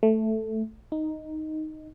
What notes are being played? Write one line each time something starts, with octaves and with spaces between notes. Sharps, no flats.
A3
D#4